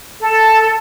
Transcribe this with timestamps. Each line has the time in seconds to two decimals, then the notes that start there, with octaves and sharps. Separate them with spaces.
0.20 A4